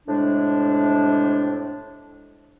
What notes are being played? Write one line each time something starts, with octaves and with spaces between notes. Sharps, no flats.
A2 C3 G#3 D4